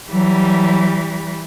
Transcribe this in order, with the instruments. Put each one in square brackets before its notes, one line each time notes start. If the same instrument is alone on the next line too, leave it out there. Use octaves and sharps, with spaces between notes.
[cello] E3 G3 [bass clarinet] F#3